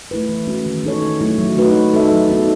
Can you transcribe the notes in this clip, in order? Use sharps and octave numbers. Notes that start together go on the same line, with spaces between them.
A3 E4 B4
E3
G#3 C#4 F#4
D#3
G#3 D#4 A4 C#5
D#3
F#3 A3 E4
F#3
A3 D#4 F#4 B4
G#3
D#4 A4 E5
F#3
B3 D#4 A4